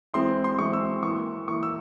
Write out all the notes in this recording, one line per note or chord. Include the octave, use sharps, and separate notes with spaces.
E3 G#3 C4 E4 C6
C6
E3 G#3 C4 E4 C#6
E6
E3 A#3 E4 C#6
E3 A#3 E4 C#6
E6